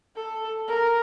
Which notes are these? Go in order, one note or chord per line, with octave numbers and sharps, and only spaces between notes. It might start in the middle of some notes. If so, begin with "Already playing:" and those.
A4
A#4